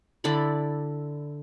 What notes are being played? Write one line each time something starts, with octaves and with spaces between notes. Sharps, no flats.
D3 E4 D5 B5